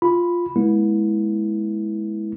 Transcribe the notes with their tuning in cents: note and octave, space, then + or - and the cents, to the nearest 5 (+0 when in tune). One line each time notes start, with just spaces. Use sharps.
F4 +0 B5 +0
G#3 +15 B3 -40 E4 -15